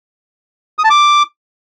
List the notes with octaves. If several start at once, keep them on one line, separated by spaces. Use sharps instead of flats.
D#6
A5
D6